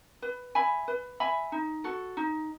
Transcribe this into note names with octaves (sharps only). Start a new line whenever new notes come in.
B4
E5 G#5 B5
B4
E5 G#5 B5
D#4
F#4 A4
D#4